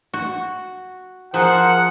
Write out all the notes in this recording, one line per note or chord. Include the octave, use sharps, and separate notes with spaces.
F#4
F3 G#4 A#4 C5 F#5